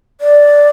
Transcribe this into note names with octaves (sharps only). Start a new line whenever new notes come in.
D5